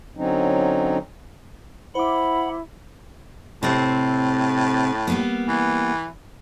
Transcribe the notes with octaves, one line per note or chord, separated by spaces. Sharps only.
D3 F#3 C4 C#4 D#4
E4 C5 F#5 B5 D6
A2 C3 C4
G3 A#3 B3
E3